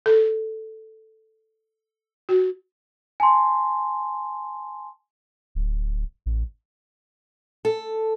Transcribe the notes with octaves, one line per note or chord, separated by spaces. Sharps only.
A4
F#4
G#5 A5 C6
D1
A1
A4